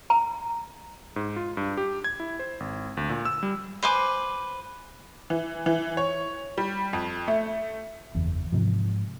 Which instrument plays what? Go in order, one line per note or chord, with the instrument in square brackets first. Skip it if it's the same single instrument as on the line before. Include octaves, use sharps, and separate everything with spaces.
[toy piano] A#5
[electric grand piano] G#2
F4
G2
G4
G#6
E4
C5
G#1
D2
A#2
E6
G3
[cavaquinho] B4 C5 G#5 D6
[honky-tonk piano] E3
E3
C#5
G3
F2
A3
[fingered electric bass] F#1 E2
G#2 C3 F3